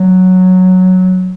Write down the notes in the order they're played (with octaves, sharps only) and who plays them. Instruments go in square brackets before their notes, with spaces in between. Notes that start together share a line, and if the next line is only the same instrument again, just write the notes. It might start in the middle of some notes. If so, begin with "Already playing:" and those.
Already playing: [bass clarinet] F#3